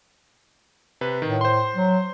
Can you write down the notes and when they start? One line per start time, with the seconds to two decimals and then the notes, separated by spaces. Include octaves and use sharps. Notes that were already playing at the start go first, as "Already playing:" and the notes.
1.01 C3 B4
1.22 A2 D#3
1.41 C5 C6
1.76 F#3